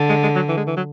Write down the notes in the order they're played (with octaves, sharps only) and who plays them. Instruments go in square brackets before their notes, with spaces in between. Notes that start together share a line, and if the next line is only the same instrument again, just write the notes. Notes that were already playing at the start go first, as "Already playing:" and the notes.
Already playing: [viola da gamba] D3
[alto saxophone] G#3
G#3
F#3
E3
G#3
E3
F#3